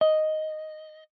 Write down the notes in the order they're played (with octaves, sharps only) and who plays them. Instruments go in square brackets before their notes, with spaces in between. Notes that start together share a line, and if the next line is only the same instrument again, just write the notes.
[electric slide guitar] D#5